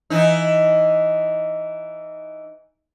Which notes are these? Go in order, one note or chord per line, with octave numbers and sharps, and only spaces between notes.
E3 D#4